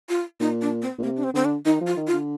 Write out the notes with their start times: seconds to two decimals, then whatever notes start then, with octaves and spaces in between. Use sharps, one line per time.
0.09 F4
0.40 A#2 D#4
0.62 D4
0.82 C4
0.98 A#2
1.03 C3 A#3
1.17 D4
1.24 C4
1.34 D3 C4
1.45 D4
1.66 D#3 D#4
1.81 F3
1.87 F4
1.97 D#3
2.07 F4
2.13 D3